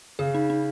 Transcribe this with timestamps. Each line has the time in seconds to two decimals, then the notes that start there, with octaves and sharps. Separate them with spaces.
0.19 C#3 G#4
0.34 D#4
0.50 D#4